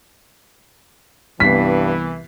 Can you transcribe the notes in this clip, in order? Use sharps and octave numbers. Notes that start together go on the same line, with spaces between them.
C2 G2 E3 B3 B6 C7